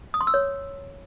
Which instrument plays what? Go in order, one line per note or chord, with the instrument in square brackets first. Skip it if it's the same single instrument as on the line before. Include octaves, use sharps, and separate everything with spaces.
[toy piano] D#6
C6
E6
C#5